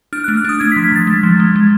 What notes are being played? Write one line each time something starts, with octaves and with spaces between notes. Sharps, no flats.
D4 F6
F#6
A3
F6
D4 D#6
A3 G#6
B6
F3
B6
F3 A6
G#3
F3
G#3
G#3